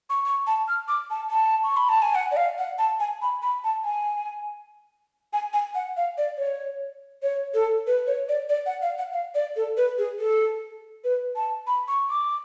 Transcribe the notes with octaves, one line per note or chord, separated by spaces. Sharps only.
C#6
C#6
A5
F6
D6
A5
A5
C#6
B5
A5
G#5
F#5
D5
F5
F#5
A5
G#5
B5
B5
A5
G#5
G#5
G#5
F#5
F5
D5
C#5
C#5
A4
B4
C#5
D5
D5
F#5
F5
F#5
F5
D5
A4
B4
G#4
A4
B4
A5
B5
C#6
D6